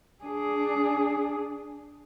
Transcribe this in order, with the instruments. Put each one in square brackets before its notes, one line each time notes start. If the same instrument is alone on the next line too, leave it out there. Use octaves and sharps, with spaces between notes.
[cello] D4 G#4